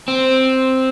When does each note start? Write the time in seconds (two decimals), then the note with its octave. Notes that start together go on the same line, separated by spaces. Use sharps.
0.08 C4